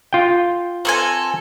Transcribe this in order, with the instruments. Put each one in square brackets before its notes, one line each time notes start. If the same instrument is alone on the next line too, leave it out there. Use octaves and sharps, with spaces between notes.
[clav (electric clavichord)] F4 G5
[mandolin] C4 A4 G#5